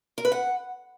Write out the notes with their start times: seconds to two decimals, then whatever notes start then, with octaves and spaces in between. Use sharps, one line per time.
0.18 A#4
0.25 B4
0.32 F#5